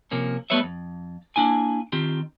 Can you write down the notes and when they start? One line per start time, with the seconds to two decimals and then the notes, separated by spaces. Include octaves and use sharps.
0.11 C3 F3 A#3 C#4
0.50 G3 A3 B3 B4 C#5 E5
0.63 F2
1.36 A#3 D4 E4 G#5
1.92 D#3 C4 F4 G4